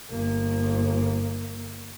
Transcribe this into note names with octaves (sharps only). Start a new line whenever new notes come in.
G1 A#3